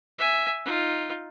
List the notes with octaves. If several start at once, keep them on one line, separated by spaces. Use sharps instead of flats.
E5 G#5
D#4 F4